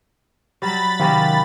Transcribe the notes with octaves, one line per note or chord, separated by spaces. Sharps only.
F#3 G3 B5 A6
C3 D#3 F#3 C#4 F5 G5